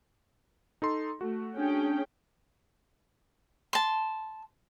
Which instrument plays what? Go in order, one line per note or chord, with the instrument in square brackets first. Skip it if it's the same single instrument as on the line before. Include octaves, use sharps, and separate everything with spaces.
[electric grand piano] D#4 A4 C6
[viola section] A3 [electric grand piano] F#4
[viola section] C#4 G#4 G5 [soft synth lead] D4
[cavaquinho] A5 C6